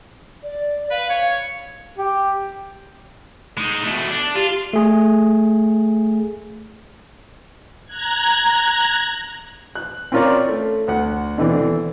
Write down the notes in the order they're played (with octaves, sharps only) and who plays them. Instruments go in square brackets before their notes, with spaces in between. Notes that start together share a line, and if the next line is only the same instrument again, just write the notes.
[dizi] D5
[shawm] B4 [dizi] F5
[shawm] C#5 [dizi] F5
[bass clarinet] G4
[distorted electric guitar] G#3 D#4
B2 A3
D4
[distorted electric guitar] F4 [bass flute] G4
[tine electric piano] A3 G#4
[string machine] A#5 F#6 G#6
[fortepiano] F#6
C4 C#4 F4 A#4 C#5 D5
A3
D2 F#5
B2 D3 E3 A3 C4 D4
E3